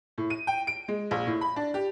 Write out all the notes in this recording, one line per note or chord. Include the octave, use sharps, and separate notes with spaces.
A2
D#7
G5
D7
G#3
A#1
A2
B5
D4
G4